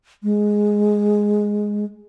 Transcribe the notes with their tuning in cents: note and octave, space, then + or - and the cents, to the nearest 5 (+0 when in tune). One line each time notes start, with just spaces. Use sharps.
G#3 +0